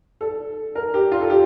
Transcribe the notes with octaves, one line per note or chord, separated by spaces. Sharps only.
A4
A#4
G4
F4
A4
G4